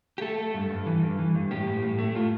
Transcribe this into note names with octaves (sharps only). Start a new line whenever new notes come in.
G4
A3 A4
A3
G2
G2
E3
G2
E3
G2
A2 G4
A2
A2
A3
A2 F4